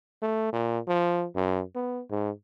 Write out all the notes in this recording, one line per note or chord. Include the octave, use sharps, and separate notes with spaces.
A3
A#2
F3
F#2
B3
G#2